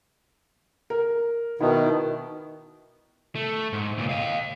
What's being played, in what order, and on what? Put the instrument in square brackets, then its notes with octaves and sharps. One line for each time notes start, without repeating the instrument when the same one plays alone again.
[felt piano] A#4
[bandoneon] B2 D#3 [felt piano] E4
[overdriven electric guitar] A3
G#2
C#2 A#2
D#5 F5